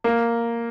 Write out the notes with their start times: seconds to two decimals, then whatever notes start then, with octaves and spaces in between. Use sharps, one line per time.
0.04 A#3